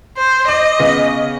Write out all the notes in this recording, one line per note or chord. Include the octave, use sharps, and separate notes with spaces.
C5
D#5 D6
C#3 B3